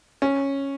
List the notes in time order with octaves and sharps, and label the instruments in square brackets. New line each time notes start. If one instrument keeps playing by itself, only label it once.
[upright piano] C#4